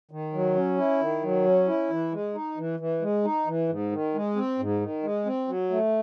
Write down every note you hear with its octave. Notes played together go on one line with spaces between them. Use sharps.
D#3
F#3
C#4
E4
D#3
F#3
C#4
E4
E3
G#3
D#4
E3
E3
G#3
D#4
E3
G#2
D#3
G#3
C4
G#2
D#3
G#3
C4
F#3
A3